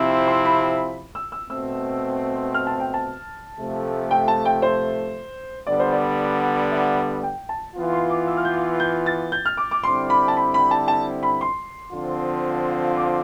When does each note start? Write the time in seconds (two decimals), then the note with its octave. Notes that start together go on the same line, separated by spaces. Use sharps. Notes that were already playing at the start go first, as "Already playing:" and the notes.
Already playing: C3 F3 C4 E4
0.10 C6
0.28 C6
0.45 B5
1.15 E6
1.32 E6
1.50 B2 A3 C4 E6
2.54 F6
2.67 A5
2.80 G5
2.94 A5
3.59 C3 F3 A3
4.11 G5
4.28 A5
4.45 G5
4.62 C5
5.67 D3 G3 B3 D5
5.80 C5
5.92 D5
6.71 E5
7.23 G5
7.49 A5
7.76 E3 B3 F4
7.93 C6
8.10 D6
8.27 E6
8.37 F6
8.45 G6
8.80 G6
9.06 A6
9.32 G6
9.46 F6
9.57 D6
9.71 D6
9.84 D3 G3 C4 E4 C6
10.10 B5
10.28 A5
10.37 B5
10.54 B5
10.71 A5
10.88 A5
11.23 B5
11.41 C6
11.93 D3 F3 C4 F4
12.97 D6